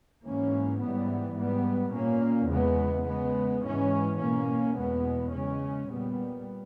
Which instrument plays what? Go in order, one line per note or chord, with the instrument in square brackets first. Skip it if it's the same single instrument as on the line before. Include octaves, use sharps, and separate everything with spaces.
[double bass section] G#2 E3 A#3 C#4
G#2 E3 G3 B3
G#2 G3 B3
A#2 A#3 C#4
E2 C#3 G#3 B3
C#3 G#3 B3
G#2 E3 G#3 C#4
B2 A#3 C#4
E2 B2 G#3 B3
C#3 G#3 C#4
A#2 G3 B3